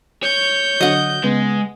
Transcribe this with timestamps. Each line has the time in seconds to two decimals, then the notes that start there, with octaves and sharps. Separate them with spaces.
0.23 C#5 G6
0.81 D3 F#3 D#5 F#5
1.23 C#3 G#3 B3